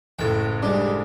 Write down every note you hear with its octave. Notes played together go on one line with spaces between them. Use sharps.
F#1 A2 G5
G3 G#3 D4